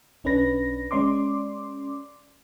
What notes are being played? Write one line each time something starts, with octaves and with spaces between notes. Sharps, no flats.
B1 C#4 D4 B4 A#6
G#3 C#4 D5 C6 D6